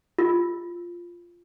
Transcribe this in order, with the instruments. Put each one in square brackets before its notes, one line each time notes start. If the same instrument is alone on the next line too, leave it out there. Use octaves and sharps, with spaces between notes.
[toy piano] F4